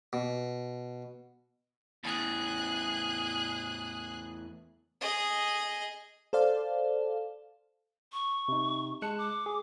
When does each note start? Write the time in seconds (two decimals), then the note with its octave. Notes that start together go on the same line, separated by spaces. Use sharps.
0.13 B2
2.04 E2 A2 G#4 F#6
5.01 G#4 D#5
6.33 A4 C5 D5 F5 A5
8.13 C#6
8.48 C3 D#4
9.02 G#3 A5 F#6 C#7
9.18 D6
9.46 G#4